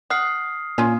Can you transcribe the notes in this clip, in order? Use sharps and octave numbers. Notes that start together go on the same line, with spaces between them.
F#5 D#6 F6 C7
A#2 C#4 F4